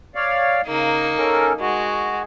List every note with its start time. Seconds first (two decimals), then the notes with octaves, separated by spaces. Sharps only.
0.15 C#5 D5 F5
0.67 C#3 A#3 D#4
1.17 C#4 A4 A#4
1.60 G#3 F#4